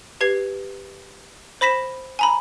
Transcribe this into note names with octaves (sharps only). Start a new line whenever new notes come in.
G4 B4 G#6 C7
C5 B5 A#6 B6 E7
G#5 A#5 B5